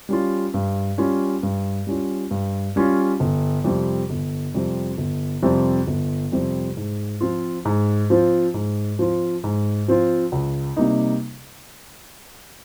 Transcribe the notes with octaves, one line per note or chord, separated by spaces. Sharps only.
G3 C#4 F4
G2
G3 C#4 F4
G2
G3 C#4 F4
G2
G3 C#4 F4
G1
F2 C3 G3 C4
G1
F2 C3 G3 C4
G1
F2 C3 G3 C4
G1
F2 C3 G3 C4
G#2
F3 C4 F4
G#2
F3 C4 F4
G#2
F3 C4 F4
G#2
F3 C4 F4
C#2
C3 G3 A#3 D#4